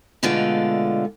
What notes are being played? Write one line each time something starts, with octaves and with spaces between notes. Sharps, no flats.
B2 D3 G#3 A3 F4 D5